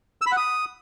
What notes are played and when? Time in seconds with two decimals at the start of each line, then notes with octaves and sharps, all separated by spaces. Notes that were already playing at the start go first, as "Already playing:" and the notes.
0.22 E6
0.27 B5
0.32 F#5
0.37 D#6